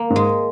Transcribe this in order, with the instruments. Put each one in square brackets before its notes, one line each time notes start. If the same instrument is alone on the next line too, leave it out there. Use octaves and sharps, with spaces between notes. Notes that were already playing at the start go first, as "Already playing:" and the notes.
Already playing: [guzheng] A#3
[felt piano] G#2
[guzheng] G#3